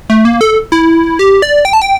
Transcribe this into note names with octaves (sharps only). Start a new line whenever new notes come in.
A3
A#3
A4
E4
G4
D5
G5
A5
G5